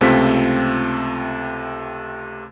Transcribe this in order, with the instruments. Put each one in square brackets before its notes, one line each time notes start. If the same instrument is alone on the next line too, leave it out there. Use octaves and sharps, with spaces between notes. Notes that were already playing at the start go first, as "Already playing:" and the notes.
[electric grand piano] C#2 C3 A3 C4 F4 B6